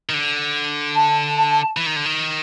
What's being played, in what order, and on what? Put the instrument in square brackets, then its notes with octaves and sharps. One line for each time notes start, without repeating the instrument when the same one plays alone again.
[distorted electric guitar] D#3
D3
[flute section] A5
[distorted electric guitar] E3
D#3
D3
D#3